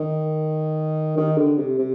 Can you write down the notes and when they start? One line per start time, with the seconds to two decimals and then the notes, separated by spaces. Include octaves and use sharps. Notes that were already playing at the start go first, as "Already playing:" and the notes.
Already playing: D#3
1.17 D#3
1.37 D3
1.58 C3
1.78 C3